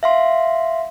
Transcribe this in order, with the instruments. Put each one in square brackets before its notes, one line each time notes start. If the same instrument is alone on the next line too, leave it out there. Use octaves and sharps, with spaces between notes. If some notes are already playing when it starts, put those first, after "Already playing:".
[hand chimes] E5 F5 C6